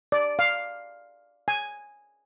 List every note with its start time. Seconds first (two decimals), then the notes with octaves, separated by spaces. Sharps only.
0.12 D5
0.39 F5
1.48 G#5